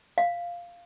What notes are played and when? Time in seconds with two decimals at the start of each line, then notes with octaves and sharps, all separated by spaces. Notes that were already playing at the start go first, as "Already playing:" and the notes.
0.18 F5